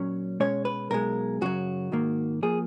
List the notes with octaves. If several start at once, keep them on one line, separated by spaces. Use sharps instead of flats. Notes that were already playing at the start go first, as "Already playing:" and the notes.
Already playing: A#2 F#3 C#4
B2 G#3 C#4 C#5
B4
B1 B2 G#3 A#4
F#2 C#3 F#3 F#4
G#2 D#3 A#3
F3 A#3 G#4